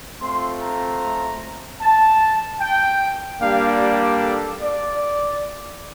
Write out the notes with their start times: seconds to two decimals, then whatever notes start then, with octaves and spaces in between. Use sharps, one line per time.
0.21 A3 C4 F4 C6
0.61 A#5
1.81 A5
2.61 G5
3.41 G3 A#3 D4 G4 F5
3.81 G4
4.21 A4
4.61 D5